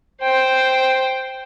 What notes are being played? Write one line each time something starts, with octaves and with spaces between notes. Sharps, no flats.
C5 G5